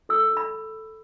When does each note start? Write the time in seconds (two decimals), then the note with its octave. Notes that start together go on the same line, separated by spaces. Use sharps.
0.09 A4 E6
0.32 A4
0.37 B5